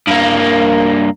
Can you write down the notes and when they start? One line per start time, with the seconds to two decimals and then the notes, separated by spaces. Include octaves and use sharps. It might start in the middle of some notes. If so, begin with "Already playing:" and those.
0.07 G2 A#3